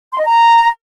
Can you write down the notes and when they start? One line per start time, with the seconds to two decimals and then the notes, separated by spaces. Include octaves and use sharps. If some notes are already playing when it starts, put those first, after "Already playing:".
0.12 C6
0.19 D#5
0.25 A#5